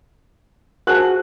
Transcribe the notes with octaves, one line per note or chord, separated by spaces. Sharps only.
F#4 G#4 A#4 C5 A5 F#6